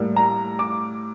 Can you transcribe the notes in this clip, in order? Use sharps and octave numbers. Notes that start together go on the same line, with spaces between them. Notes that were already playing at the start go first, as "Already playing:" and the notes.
Already playing: A2 G3 A#3
A#5
D6